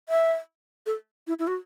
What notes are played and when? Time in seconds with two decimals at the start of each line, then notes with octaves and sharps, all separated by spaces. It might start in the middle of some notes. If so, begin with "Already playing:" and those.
0.09 E5
0.86 A4
1.27 E4
1.39 E4
1.47 F#4